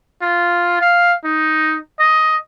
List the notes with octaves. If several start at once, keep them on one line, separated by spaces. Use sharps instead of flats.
F4
F5
D#4
D#5